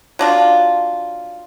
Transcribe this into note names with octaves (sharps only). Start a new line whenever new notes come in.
F#3 D4 F4